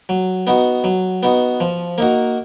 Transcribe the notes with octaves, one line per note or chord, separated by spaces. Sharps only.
F#3
B3 D#4 F#4
F#3
B3 D#4 F#4
F3
A#3 D#4 F#4